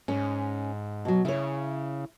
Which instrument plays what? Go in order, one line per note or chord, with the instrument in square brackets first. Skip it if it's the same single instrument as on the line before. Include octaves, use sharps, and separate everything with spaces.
[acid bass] G#2 [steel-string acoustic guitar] C#4
[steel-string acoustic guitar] B2 F#3
[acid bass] C#3 [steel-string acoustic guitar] E4 C#5